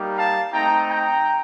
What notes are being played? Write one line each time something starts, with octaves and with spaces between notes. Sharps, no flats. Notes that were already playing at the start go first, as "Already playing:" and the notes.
Already playing: G3 A#3 D#4 G4
F5 A5
A3 C4 D#4 G5 A#5
G5 A#5